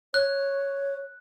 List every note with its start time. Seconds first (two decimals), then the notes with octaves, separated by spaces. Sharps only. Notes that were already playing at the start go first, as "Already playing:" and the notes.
0.14 C#5 F#6